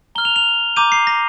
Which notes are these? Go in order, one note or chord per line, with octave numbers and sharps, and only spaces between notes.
A#5 F6 G7
F7
F7
A#5 D6 G6 D#7
C7
A#6